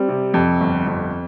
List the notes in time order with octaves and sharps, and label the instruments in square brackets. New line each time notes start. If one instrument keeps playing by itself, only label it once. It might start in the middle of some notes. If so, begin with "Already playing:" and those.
Already playing: [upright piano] G3 [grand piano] C4
[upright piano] C3
F2
G1
F2